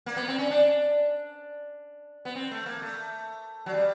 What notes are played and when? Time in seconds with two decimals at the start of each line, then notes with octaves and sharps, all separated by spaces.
0.06 A#3
0.16 B3
0.28 C4
0.38 C#4
0.50 D4
2.25 B3
2.35 C4
2.51 A3
2.66 A#3
2.82 A3
3.66 F#3
3.74 G3